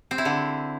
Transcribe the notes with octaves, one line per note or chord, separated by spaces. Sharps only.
C4
E4
D3